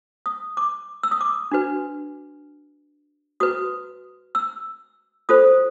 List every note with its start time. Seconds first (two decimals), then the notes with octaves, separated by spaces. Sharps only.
0.26 D#6
0.57 D6
1.03 E6
1.11 D#6
1.21 D6
1.52 D4 F#4 B4
3.40 F#4 B4 D#6
4.35 E6
5.29 F4 A4 C5 D#6